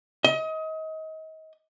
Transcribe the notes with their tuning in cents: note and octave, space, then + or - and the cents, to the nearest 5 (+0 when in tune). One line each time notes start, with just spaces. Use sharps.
D#5 +30